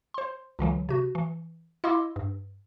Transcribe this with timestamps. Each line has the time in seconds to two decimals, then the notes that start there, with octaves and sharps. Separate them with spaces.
0.14 C5 C6
0.59 C#2 D3 E3 F#3
0.89 C3 F#4
1.15 E3
1.84 E4 D#5 F5 C6 D6 E6
2.16 G2